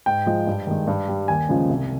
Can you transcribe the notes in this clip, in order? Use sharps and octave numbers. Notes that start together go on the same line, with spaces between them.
G#2 G5
F3 G#3
G2
D#3 G#3
G2
G3
D#2 G#5
C#3 F3 G#3
C2